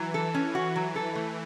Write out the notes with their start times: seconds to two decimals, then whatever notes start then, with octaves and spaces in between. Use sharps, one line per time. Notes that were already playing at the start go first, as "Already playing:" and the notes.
Already playing: E3 F#3
0.14 A4
0.34 C#4
0.55 F#4
0.76 F#3
0.96 A4
1.15 A3